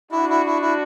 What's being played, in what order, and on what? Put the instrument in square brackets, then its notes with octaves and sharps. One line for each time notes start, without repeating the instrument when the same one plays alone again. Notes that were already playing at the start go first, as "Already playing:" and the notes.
[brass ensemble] D4 F#4 [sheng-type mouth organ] E4
[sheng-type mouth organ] E4
E4
E4